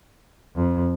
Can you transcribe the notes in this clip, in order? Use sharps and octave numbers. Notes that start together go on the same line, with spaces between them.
F2